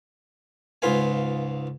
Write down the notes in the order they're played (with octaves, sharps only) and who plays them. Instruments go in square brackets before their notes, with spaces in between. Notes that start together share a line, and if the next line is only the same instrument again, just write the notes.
[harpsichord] C#2 G#2 F4 B4 F5 G#5